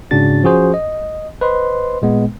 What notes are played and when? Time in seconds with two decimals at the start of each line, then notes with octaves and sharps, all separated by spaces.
0.11 G#2 C#3 D4 F#4 A6
0.43 F3 C#4 F#4 G#4 C5
0.74 D#5
1.41 B4 C5 D#5 C6
2.02 A#2 G#3 B3